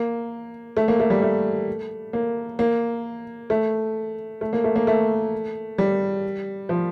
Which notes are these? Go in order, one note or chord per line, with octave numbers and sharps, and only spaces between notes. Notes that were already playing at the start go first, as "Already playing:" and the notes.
Already playing: A#3
A3
A#3
A3
G3
A3
A#3
A#3
A3
A3
A#3
A3
A#3
A3
G3
F3